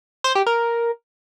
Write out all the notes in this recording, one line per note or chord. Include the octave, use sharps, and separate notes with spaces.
C5
G4
A#4